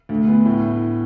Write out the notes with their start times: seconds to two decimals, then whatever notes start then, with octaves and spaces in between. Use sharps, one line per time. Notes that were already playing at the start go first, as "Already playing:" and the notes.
0.09 D2 A3
0.27 B3
0.45 A2